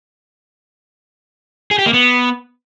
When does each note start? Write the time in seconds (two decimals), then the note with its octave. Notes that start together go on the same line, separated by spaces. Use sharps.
1.71 G#4
1.79 G4
1.86 A#3
1.94 B3